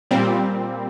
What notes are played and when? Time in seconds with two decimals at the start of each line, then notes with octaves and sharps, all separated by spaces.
0.11 A#2 G3 C4